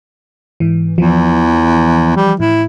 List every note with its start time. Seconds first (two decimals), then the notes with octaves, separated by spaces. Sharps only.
0.60 G#2 E3
0.98 E2 E3 F3
2.16 G3
2.40 A2 E4